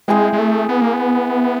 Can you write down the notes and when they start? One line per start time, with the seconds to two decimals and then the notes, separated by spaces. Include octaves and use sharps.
0.08 G#3 C4 E4 G#4 C5
0.33 G#3
0.39 A3
0.69 B3
0.82 A#3
0.93 B3